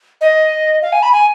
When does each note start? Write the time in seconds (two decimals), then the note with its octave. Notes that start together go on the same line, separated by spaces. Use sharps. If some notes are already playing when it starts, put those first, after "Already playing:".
0.21 D#5
0.82 F5
0.92 G#5
1.03 B5
1.12 G#5